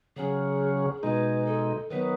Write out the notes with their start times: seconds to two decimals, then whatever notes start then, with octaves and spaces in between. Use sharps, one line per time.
0.16 C#3 F#3 C#4 G#4
1.03 B2 G#3 D#4 B4
1.46 A4
1.90 D#3 F#3 B3 B4